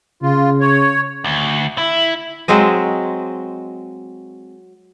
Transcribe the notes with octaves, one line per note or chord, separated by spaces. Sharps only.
C#3 F4
C#5
D2
E4
F#3 G#3 C4 D#5